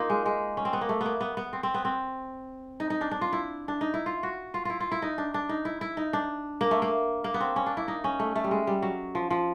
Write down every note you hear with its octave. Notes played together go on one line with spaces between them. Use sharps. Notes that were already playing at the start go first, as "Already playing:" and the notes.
Already playing: A#3 D#4 F4
G#3
G#3
C#4
C4
B3
A#3
A3
A#3 B3
B3
B3
C4
C4
B3
C4
D#4
D#4
D4
D4
F4
E4
D4
D#4
E4
F4
F#4
F4
E4 F4
F4
E4
D#4
D4
D4
D#4
E4
E4
D#4
D4
A#3
A3
A#3
A#3
B3
C4
C#4
D4
E4
D#4
C#4
A3
A3
G3
G#3
G3
F#3
F3
F3